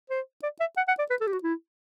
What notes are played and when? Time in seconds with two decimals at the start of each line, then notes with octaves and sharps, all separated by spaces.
0.10 C5
0.43 D5
0.60 E5
0.77 F#5
0.88 F#5
0.99 D5
1.10 B4
1.21 A4
1.27 G4
1.32 F#4
1.43 E4